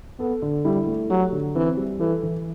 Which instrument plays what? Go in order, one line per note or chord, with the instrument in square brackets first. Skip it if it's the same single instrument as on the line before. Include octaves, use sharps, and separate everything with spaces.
[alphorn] B3 [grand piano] A4
[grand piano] D3
[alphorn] G3 [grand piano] E4
[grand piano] A3
[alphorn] F#3 [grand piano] G4
[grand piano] D3
[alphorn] E3 [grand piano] C4
[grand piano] G3
[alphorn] E3 [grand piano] A4
[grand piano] E3